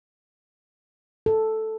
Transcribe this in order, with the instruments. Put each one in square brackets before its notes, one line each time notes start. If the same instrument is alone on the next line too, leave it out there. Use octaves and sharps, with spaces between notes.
[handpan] A4